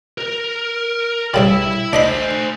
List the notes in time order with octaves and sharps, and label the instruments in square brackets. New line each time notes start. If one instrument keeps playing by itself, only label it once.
[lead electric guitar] A#4
[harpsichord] G2 C#3 G3 [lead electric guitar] E5 B5
[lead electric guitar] A3 C5 [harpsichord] D4 D#5 B5